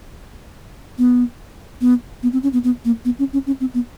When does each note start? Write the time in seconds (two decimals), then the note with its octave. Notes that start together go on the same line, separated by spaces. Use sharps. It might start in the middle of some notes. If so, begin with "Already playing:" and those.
0.98 B3
1.81 B3
2.23 B3
2.33 C4
2.43 C#4
2.53 B3
2.64 B3
2.85 A#3
3.05 B3
3.19 C#4
3.33 C#4
3.47 C#4
3.60 C4
3.74 B3